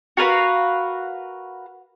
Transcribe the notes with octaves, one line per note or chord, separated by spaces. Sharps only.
F#4 A#4 B4 F5